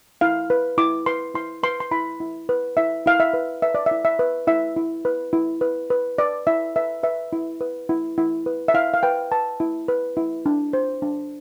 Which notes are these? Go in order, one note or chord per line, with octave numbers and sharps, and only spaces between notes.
E4 F5
B4
E4 D6
B4 C6
E4 C6
B4 C6
C6
E4 B5
E4
B4
E4 E5
E4 F5
E5
B4
B4 E5
D5
E4 E5
E5
B4
E4 E5
E4
B4
E4
B4
B4
B4 D5
E4 E5
B4 E5
B4 E5
E4
B4
E4
E4
B4
E5
E4 F5
F5
B4 G5
B4 A5
E4
B4
E4
D4
C5
D4